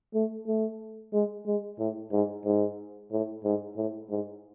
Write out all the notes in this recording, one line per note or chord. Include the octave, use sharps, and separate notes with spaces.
A3
A3
G#3
G#3
A2
G#2
G#2
A2
G#2
A2
G#2